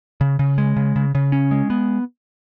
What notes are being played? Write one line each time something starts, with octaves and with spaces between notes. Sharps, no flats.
C#3
C#3
G#3
C#3
C#3
C#3
C#4
G#3
B3